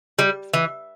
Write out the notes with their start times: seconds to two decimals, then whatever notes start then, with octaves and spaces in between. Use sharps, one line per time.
0.19 G3
0.53 E3